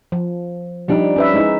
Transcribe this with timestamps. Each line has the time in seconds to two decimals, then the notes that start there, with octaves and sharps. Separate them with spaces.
0.12 F3
0.88 F3 G3 D4 D#4 G4
1.16 C#4 B4 E5
1.34 G#3 D#4 E4